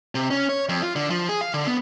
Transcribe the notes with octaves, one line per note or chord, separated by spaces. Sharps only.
C3
C#4
C#5
F2
F4
D3
F3
G#4
F5
D3
B3